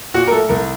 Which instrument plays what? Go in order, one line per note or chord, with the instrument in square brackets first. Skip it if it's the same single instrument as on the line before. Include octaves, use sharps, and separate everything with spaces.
[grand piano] A#2 F#4
A#4
A3 A4
C2 A#4